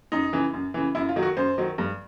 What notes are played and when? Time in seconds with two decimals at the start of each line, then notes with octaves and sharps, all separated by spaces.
0.12 F#2 D#4
0.33 C#3 E3
0.53 F#2
0.74 C#3 E3
0.95 F#2 E4
1.09 F4
1.16 D#3 F#3
1.23 F#4
1.37 F#2 C5
1.58 D#3 F#3
1.78 G2